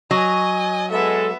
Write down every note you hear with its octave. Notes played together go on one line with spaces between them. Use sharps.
F#3 D#5 G#5
G#3 B3 A4 E5